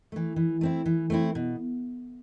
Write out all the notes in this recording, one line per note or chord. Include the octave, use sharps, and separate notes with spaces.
E3 A3
E3
A3 C4 E4
E3
A3 C4 E4
B2